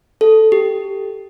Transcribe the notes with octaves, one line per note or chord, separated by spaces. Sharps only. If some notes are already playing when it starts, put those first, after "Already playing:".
A4
G4